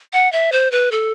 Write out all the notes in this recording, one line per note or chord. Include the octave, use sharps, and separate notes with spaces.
F#5
E5
C5
B4
A4